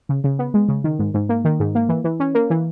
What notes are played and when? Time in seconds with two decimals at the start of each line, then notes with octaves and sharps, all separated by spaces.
0.09 C#3
0.24 C#3
0.39 B3
0.54 G#3
0.69 C#3
0.84 D#3
0.99 G#2
1.14 G#2
1.29 A#3
1.45 D#3
1.60 G#2
1.75 A#3
1.89 E3
2.04 E3
2.20 C#4
2.35 A#3
2.50 E3